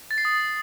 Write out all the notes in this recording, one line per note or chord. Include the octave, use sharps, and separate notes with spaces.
A6
C7
D#6